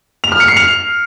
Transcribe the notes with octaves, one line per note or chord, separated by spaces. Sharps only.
F7
F6
C#7
C7
F7